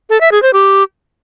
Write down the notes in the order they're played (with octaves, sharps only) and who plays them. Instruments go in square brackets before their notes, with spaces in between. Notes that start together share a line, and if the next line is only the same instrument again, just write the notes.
[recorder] A4
E5
G#4
C5
G4